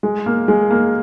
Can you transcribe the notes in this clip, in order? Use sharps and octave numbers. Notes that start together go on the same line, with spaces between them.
G#3
A#3
G#3
A#3